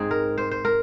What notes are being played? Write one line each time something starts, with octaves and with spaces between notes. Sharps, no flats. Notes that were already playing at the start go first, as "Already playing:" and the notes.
Already playing: G#2 G#3 C4 D#4 G#4
A#4
C5
C5
A#4